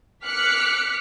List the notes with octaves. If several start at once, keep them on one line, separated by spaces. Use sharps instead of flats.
D6 F6 F#6 B6 C#7